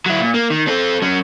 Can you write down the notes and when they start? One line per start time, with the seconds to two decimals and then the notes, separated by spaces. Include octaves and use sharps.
0.06 F#3 E4
0.20 A#2
0.34 A#3
0.50 D#3
0.67 C4 A4
1.02 F#3 C#4